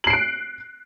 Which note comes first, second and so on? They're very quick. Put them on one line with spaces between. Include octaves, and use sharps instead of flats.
F#7 C7 D7 F#6